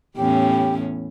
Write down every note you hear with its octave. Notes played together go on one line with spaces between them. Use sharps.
E2 A2 C#4 G4